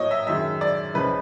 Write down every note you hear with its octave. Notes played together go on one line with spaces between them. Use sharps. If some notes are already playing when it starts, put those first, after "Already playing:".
Already playing: A2 F#3 A#3 C#5 D#5
E5
F#2 D#3 G#3 E5
D5
C#2 C#3 F3 G#3 B4